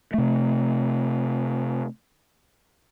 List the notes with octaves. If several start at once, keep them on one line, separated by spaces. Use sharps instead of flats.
C3 A3